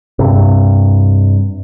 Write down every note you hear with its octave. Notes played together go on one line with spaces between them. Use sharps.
G2 C3